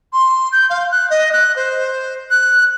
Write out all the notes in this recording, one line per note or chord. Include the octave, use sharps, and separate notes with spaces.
C6
G6
F5
F#6
D#5
F#6
C5
F#6